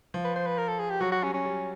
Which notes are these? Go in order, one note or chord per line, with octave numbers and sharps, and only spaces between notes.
F3
B4
C5
B4
A#4
A4
G#4
G4
F#3 F#4
F#4
G3 C#4
C#4
G3